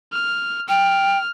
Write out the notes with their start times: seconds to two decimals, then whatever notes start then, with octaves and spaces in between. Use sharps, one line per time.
0.13 F6
0.69 G5 F6